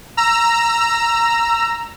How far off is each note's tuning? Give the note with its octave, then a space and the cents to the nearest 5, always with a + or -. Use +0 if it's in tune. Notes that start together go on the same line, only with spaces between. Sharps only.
A#5 +0 E6 +25